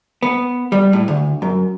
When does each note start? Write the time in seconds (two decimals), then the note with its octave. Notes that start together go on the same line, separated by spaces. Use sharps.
0.22 B3
0.72 G3
0.93 A2
1.08 D2
1.42 F#2